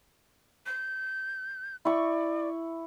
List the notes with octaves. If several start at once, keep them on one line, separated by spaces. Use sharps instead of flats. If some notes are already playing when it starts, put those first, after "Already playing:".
G6
E4 D5 C#6